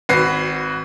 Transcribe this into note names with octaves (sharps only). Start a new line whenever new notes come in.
G#1 F#4 B4 C7